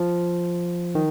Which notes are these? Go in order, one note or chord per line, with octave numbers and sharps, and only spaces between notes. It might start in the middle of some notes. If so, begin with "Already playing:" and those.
Already playing: F3
D#3